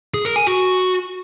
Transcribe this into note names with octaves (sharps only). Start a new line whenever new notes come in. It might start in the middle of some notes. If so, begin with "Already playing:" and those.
G#4
A#4
G#5
F#4